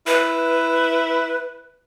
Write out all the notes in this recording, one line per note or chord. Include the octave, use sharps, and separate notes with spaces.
E4 B4